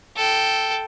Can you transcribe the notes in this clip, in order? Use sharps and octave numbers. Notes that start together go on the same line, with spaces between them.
A4 G5